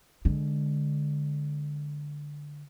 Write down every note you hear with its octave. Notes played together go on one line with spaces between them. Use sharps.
D3 G#3